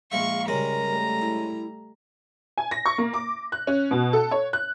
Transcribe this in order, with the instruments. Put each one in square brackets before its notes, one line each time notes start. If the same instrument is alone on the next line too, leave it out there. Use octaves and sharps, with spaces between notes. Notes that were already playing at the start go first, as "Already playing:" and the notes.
[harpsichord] A#1 G#3 E5 [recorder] F5 [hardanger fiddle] C#6
[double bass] C#3 G3 [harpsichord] G#3 C#4 [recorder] A#4 [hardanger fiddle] A#5
[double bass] G3 A3
[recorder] E4
[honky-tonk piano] G#5
A#6
C#6
A#3
D6
F#6
C#4
B2
A4
C#5
F#6